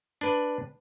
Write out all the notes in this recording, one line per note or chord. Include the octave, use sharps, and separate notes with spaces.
D4 B4